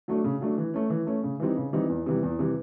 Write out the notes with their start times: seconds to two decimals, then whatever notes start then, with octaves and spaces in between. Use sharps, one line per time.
0.08 F#3 A3 D4
0.24 C#3
0.41 F#3 A3 D4
0.58 E3
0.74 A3 C#4
0.90 E3
1.07 A3 C#4
1.23 C#3
1.40 E3 G3 C4 D#4
1.57 C#3
1.73 E3 G3 C4 D#4
1.89 E2
2.06 C3 E3 G3
2.23 E2
2.39 C3 E3 G3